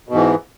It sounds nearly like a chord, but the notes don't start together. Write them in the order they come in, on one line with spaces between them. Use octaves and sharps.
B2 G#2 E3